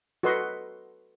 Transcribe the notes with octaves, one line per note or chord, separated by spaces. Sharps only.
F#4 A4 B4 D#5 C6